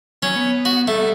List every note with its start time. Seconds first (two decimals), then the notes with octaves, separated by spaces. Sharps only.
0.23 F#3 C#4
0.36 B3
0.65 F#4
0.88 G3 A3 E5